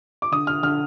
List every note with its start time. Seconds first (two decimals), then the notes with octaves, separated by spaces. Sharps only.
0.22 D6
0.32 D3 D#6
0.47 F6
0.63 D3 F6